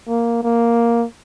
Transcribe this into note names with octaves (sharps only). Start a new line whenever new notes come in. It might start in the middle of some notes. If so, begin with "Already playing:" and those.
A#3
A#3